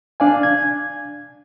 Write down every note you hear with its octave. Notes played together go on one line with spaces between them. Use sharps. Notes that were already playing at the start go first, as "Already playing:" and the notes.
D4 D5 F5 G#5
G#6